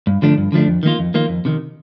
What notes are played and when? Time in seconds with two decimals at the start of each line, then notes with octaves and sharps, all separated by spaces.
0.07 G2
0.22 D3 F3 A3 D4
0.38 G2
0.52 D3 F3 A3 D4
0.68 F2
0.83 D#3 A#3 F4
0.99 F2
1.14 D#3 A#3 F4
1.29 F2
1.45 C3 D#3